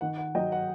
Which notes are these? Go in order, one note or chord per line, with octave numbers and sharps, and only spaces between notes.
D#3 F#5
F#5
F#3 D#5 G5
F#5